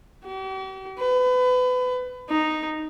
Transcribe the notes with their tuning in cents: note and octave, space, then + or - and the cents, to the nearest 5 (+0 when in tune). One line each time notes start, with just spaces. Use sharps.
G4 -45
B4 +30
D#4 -5